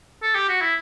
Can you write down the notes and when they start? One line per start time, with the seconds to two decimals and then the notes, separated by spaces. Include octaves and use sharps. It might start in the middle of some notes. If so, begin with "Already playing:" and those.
0.22 A4
0.35 G4
0.49 F#4
0.61 E4